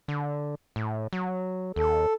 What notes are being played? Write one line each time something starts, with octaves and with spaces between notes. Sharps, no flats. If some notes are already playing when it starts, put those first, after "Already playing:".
D3
A2
F#3
D#2 A4